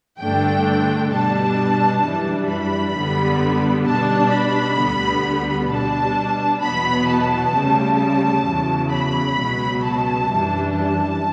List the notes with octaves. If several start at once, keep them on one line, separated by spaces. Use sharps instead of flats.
G2 D3 A3 D4 G5
B2 G3 D4 A5
F#2 E3 G3 D4
B5
F#2 D3 G3 B3
B2 G3 D4 A5
B5
D2 D3 G3 B3
B2 G3 D4 A5
E2 B2 F#3 B3 B5
A5
D2 C#3 G3
A5
E2 C#3 F#3
B5
C#2 B2 F#3
A5
F#2 E3 G3 D4
A5